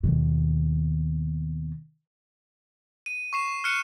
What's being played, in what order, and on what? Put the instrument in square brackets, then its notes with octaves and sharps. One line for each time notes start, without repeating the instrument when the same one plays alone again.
[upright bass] D#2 B2
[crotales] D#7
C#6 C7 E7
F6 F#6 C#7 D#7 E7